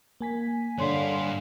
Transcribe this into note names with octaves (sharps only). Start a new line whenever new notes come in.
A#3 G#5 B6
G2 D3 C#5 F5 C6